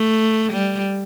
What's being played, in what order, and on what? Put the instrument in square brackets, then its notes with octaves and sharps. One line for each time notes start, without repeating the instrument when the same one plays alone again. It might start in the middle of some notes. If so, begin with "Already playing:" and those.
Already playing: [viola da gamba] A3
G3